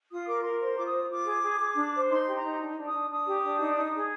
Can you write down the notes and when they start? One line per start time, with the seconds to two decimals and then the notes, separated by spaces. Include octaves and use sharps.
0.10 F4 D#6
0.27 A#4 D6
0.44 A#4 C6
0.60 C5 C6
0.77 F4 D6
0.85 D#6
0.94 F4
1.10 F4 D6
1.26 G#4
1.44 G#4
1.60 G#4
1.77 D4
1.94 C5
2.10 D#4 C6
2.27 G4
2.35 A#5
2.43 D#4
2.60 D4
2.77 D4
2.85 D#6
2.93 D4
3.10 D4 D#6
3.27 G4
3.44 D4
3.60 D#4
3.77 D#4
3.93 G#4